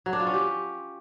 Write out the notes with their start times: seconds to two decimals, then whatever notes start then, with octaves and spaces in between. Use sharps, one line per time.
0.06 F#3
0.13 D4
0.20 F4
0.27 C#4
0.34 G4